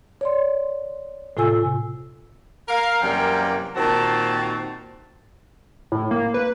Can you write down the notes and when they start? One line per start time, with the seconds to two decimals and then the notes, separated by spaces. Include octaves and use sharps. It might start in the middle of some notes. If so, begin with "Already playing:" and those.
0.21 C#5 D5 C6
1.37 A2 C3 F4 A4 G#5 E6
2.68 A#4 F5
3.02 F#2 C3 E3 G3 A#3 G5
3.76 A#2 D#3 C4 F#4 A5
5.92 A2
6.11 A#3
6.34 B4